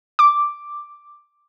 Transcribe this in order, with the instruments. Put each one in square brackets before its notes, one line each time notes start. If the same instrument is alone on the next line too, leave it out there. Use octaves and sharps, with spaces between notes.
[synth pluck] D6